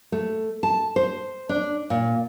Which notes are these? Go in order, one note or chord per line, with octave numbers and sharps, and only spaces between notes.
A3
A5
C5
D4
A#2